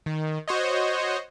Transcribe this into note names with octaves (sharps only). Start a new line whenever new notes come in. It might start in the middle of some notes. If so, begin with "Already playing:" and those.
D#3
F#4 C5 C#5 D#5